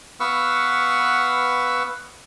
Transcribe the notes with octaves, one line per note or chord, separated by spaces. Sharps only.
B3 B4 F5 F#5 C#6 E6